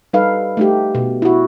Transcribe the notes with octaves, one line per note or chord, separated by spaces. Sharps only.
G3 D#4 A4 B4 F5
A3 D#4 G4
B2
E4 F#4